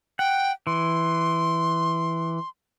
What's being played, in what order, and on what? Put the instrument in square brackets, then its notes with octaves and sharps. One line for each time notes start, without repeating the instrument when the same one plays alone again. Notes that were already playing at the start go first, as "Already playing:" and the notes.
[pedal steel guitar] F#5 [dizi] G5
[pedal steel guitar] E3 [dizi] C6